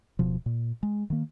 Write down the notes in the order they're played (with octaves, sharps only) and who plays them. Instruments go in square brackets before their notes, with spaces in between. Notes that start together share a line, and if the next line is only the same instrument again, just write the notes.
[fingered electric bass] D1 B2 F3
A#2
G#3
D#3 A#3